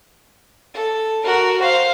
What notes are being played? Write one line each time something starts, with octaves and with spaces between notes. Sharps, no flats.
A4
F#4 A#4
C5 F5